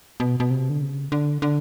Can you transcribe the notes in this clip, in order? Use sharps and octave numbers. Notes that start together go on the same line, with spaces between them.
B2
B2
C3
D3
C#3
D3
D3